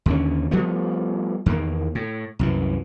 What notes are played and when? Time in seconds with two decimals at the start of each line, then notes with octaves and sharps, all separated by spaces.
0.06 D#2 D3 C#4
0.51 F3 G3 A3 B3
1.46 E2 D#3 A#3
1.95 A2
2.39 C2 F#2 E3